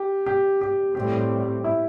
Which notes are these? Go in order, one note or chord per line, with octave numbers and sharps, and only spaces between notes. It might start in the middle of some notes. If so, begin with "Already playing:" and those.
Already playing: G4
G4
G4
A2 G3 C4 G4
E4